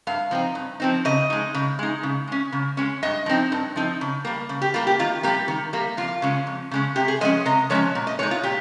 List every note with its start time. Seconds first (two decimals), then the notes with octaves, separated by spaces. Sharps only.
0.07 G2 F5
0.31 F3 C4 D#4
0.55 G2
0.80 F3 C4 D#4
1.05 C#3 D#5
1.30 G#3 D#4
1.54 C#3
1.79 G#3 D#4
2.03 C#3
2.27 G#3 C#4
2.52 C#3
2.77 G#3 C#4
3.03 G2 D#5
3.26 F3 C4 D#4
3.52 G2
3.76 F3 C4 D#4
4.01 C#3
4.25 G3 A#3
4.49 C#3
4.62 G4
4.74 G3 A#3 F4
4.87 G4
4.99 D#3 F4
5.23 G3 A#3 G4
5.48 D#3
5.73 G3 A#3
5.97 F2 F4
6.22 C#3 G#3 C#4
6.47 F2
6.71 C#3 G#3 C#4
6.96 C3 G4
7.08 G#4
7.21 F3 G#3 C#4 D#5
7.45 C3 D#5
7.70 F3 G#3 C#4 C#5
7.95 A#2
8.07 D#5
8.19 G#3 D#4 C#5
8.31 F4
8.43 A#2 G4